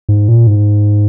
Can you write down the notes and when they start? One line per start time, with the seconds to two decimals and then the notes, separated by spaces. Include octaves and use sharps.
0.09 G#2
0.28 A#2
0.47 G#2